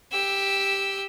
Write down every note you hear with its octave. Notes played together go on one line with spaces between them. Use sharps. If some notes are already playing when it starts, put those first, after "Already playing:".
G4 E6